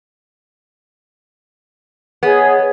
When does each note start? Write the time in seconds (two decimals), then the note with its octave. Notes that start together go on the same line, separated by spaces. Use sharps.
2.23 B3 G#4 C#5 D#5